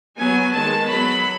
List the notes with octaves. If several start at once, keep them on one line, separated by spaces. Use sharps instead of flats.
F#3 B3 G#5
D#3 G#3 B3 A5
F#3 B3 B5